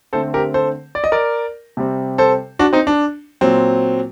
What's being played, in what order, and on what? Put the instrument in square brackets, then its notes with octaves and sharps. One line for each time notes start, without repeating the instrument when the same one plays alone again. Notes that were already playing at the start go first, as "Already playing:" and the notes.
[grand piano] D3 A3 C4 A4 C5
G4 A#4
A4 C5
D5
D#5
A#4 D5
C3 G3 C4
A4 C5
D4 F#4
C4 D#4
D4
A#2 F#3 C4